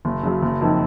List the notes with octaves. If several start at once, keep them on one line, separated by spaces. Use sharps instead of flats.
F#1
F#2 C#3
F#1
F2 D#3